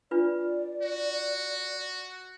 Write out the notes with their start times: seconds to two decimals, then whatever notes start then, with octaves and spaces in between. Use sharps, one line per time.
0.11 D4 F4 B4 D5
0.82 F#4